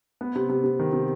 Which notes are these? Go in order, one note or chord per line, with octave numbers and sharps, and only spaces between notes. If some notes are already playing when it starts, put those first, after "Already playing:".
B3
C3
C3
C3
D#3
C3